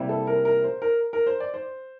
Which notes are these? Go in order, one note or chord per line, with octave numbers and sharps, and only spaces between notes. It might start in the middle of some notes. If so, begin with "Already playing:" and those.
Already playing: C3 G3 A#3 E4
A4
A#4
A#4
C5
A#4
A#4
C5
D5
C5